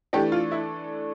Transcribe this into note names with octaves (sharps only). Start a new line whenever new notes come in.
E3 A3 D4 G4
F4
E4